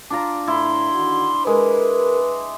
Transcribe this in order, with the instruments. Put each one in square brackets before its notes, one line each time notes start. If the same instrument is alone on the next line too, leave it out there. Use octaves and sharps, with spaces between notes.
[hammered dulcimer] D4 F4 A#5
[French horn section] A2 [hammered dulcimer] E4 [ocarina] C6
[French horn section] D3 D#3 F#4
[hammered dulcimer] G#3 [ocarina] A#4 [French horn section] B4